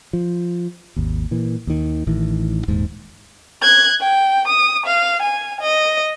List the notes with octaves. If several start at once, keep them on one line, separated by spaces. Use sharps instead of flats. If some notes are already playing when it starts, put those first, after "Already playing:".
F3
G#1 D#2
A#2 E3
D#2 D#3
A1 D#3 E3
D#1 D#2 G#2
F#6 G#6
G5
D#6
F5
G#5
D#5